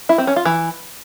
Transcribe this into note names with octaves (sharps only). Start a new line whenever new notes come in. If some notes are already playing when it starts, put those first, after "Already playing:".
E4
C4
C#4
F4
E3